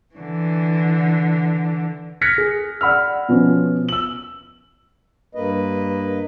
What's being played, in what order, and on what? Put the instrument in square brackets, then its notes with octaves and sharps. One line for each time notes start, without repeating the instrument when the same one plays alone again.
[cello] D3 E3
[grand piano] F6 F#6 G#6 A#6 B6 C#7
G#4
D5 F#5 B5 E6 F6
B2 F3 B3 C#4 F4
E6 F#7
[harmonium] G2 A#3 B4 D#5